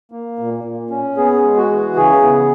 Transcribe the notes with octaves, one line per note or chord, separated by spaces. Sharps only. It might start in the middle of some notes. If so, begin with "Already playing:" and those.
A#3
A#2
A#2
C#4
B3 G#4
G#3
F#4
E3
C#3 G#4
B3